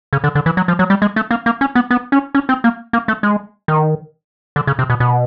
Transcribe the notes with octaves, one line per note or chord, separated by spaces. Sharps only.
C#3
D3
D3
E3
F#3
F3
F#3
G3
G#3
A3
A#3
A#3
C#4
B3
B3
C#4
C#4
C4
A#3
A#3
A3
G#3
D#3
D3
C#3
C3
B2
B2